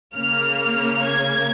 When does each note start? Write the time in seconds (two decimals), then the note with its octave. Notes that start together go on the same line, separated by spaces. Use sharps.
0.15 C#3 A#3 F6
1.06 G#6